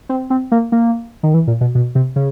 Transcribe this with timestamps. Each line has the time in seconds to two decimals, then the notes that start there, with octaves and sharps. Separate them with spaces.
0.09 C4
0.30 C4
0.52 A#3
0.72 A#3
1.23 D#3
1.34 E3
1.47 A#2
1.61 B2
1.75 B2
1.95 C3
2.16 C#3